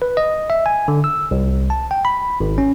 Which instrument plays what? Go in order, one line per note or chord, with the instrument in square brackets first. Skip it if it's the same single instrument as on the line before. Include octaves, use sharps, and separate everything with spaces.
[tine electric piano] B4
D#5
E5
G#5
D3
E6
C2
A5
G5
B5
G#1
C#4